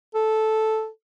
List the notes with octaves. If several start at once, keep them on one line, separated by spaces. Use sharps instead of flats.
A4